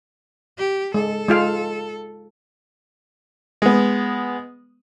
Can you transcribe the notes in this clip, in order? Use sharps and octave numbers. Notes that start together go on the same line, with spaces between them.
G4
G#3 A4
G#3 F4 F5
G#3 B3